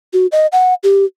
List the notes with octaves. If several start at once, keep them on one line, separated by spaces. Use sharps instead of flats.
F#4
D#5
F#5
G4